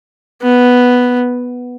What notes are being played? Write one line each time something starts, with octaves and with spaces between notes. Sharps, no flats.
B3